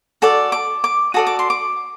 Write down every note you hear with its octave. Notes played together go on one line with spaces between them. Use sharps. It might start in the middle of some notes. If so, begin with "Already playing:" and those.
F#4 A4 D5
D6
D6
F#4 A4 D5 D#6
D6
C6
D6